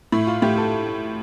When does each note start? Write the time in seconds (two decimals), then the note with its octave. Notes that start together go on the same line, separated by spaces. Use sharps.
0.12 A2 E4
0.27 F4
0.42 A2 G4
0.57 A4